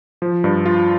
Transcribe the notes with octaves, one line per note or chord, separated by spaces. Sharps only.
F3
G2
F4